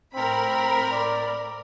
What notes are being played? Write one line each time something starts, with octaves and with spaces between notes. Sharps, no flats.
A2 C4 A#4 B5
D5